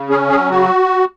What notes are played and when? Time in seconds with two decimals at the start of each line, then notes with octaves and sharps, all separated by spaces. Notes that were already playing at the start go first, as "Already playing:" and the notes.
Already playing: C#3
0.09 C#4 G#4
0.30 F#3 G#4
0.50 C#3 F#4